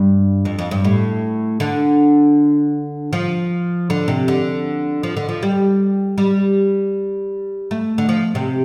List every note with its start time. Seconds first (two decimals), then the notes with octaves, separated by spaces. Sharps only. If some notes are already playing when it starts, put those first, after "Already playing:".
Already playing: G2
0.45 F2
0.59 F2
0.71 G2
0.85 A2
1.60 D3
3.13 F3
3.90 D3
4.08 C3
4.28 D3
5.03 F3
5.17 D3
5.29 F3
5.43 G3
6.18 G3
7.71 A3
7.98 D3
8.09 F3
8.35 C3